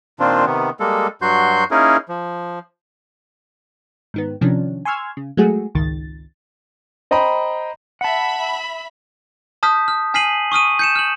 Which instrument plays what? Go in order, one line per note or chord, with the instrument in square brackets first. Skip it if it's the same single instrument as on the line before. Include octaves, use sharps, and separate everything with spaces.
[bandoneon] A#2 D#3 C4 D4 F4
C3 D#3 B3
G3 G#3 A#3 A4
G2 F#3 F#4 C6 G6
A#3 C#4 D#4 E4 G#4 A#4
F3
[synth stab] G#2 D#3 B3
C3 D#3 F3 C#4 D4
G#5 C6 C#6 E6 F6 G#6
C#3
F#3 G#3 A3 F#4 G#4
G#1 C#2 D#3 A6
[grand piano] C5 D#5 G5 A#5 B5
[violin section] E5 B5 [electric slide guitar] F#5 A5
[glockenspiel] A5 D#6 F6 G6 B6
F6
G#5 F6 B6 C7 D#7 F#7
C#6 D#6 F6 D#7
G6 C#7 E7
F6 F#7